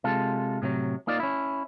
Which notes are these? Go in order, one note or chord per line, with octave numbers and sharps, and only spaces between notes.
C3 G#3 F4 A4
A2 C3 D#3 F#3
A#3 D#4 F4 D5
C#4 E4